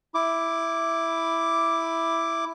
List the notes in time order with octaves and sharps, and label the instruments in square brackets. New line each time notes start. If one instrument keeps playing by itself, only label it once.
[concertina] E4 D6